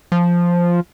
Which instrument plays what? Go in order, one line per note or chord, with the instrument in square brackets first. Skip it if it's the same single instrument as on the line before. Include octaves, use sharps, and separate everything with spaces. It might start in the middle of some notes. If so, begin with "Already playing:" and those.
[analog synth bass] F3